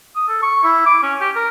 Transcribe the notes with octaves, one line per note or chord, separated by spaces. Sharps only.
D#6
A4
C#6
E4
D6
C#4
G4
A#4